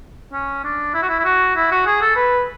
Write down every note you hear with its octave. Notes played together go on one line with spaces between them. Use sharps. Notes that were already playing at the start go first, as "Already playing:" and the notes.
C#4
D4
E4
F#4
E4
E4
F#4
E4
F#4
G#4
A4
B4